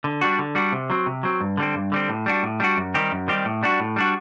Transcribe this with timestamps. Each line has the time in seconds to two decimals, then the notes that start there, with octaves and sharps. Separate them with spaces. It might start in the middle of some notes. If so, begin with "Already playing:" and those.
0.04 D3
0.21 G3 D4 F#4
0.39 D3
0.55 G3 D4 F#4
0.72 C3
0.90 F#3 C4
1.06 C3
1.23 F#3 C4
1.41 G2
1.57 D3 G3 C4
1.75 G2
1.92 D3 G3 C4
2.09 A2
2.26 G3 D4 F#4
2.43 A2
2.60 G3 D4 F#4
2.77 F#2
2.94 D#3 G3 C4 G4
3.12 F#2
3.28 D#3 G3 C4 G4
3.45 A2
3.63 G3 D4 F#4
3.80 A2
3.96 G3 D4 F#4